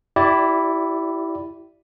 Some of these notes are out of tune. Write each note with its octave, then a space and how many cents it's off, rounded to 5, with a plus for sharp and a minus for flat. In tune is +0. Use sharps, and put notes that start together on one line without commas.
E4 +0 G4 -30 D5 +0